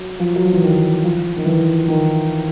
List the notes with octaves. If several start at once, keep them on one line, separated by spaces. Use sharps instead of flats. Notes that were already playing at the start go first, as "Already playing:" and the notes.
Already playing: F#3
F3
F#3
F3
E3
D#3
F3
D#3
E3
D#3